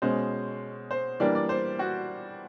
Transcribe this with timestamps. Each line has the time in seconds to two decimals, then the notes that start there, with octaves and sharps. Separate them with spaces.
0.02 B2 G#3 C#4 C5
0.91 C5
1.20 E3 G3 A#3 D4 D5
1.35 D5
1.49 C5
1.79 F#4